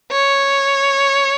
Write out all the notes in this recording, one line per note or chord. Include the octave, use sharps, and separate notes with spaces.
C#5